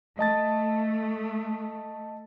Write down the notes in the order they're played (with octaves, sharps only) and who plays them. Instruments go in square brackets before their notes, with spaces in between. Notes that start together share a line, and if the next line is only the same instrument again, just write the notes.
[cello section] A3 [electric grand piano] D#5 A5 A6